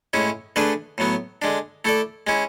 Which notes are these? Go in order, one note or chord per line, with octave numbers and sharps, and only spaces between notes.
A2 G#3 C#4 E4
D3 A3 D4 G#4 B4
A2 F#3 B3
D3 G#3 D4
A3 E4 A4 D5
G#3 C#4 E4